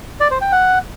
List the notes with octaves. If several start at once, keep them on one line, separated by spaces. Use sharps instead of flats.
D5
C5
G5
F#5